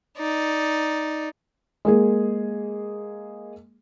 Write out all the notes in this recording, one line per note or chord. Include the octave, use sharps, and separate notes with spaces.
D#4 D5
G#3 A#3 G#4